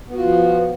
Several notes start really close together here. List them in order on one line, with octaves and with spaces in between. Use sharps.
B3 F#4 F4 F3